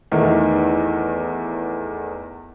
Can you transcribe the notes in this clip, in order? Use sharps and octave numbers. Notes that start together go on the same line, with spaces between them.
E2 D#3 A3